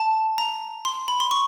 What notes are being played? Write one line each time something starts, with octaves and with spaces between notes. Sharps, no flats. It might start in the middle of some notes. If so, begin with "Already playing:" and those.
Already playing: A5
A#5
C6
B5
C6
C#6